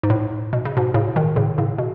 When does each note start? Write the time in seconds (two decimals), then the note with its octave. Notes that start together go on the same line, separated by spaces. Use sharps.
0.03 G#2
0.10 A2
0.53 B2
0.65 C#3
0.77 G#2 B2
0.94 A2 C#3
1.16 B2 D#3
1.36 A2 C#3
1.58 A2 C#3
1.78 B2